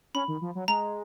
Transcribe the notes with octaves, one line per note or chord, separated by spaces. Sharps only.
C#4 B5
D#3
F3
F#3
G#3 A#5